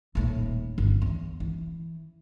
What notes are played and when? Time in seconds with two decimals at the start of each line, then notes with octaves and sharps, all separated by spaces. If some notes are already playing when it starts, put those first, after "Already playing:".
0.15 D#1 A2
0.78 G1
1.02 E2
1.40 E3